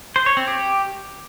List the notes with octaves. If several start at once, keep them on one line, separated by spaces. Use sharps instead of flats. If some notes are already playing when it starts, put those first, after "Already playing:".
C5
C#5
C4
G4